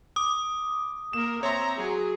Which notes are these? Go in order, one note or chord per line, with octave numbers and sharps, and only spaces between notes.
D6 D#6
A#3 A#4 E7
C4 C#5 E5 A#5 C6
F#3 G#4